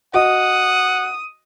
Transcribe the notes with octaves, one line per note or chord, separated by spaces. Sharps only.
F#4 D#5 F#5 D#6